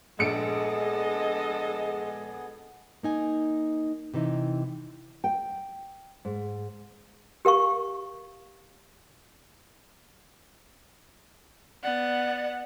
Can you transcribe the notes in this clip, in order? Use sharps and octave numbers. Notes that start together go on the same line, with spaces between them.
A#1 G#3 B3 G#4 A4 D#5 C#7 D7
A#3 D#4 G#5
C3 E3 D#4 G4
G5
G#2
G4 A#4 F5 C#6
B3 D5 F#5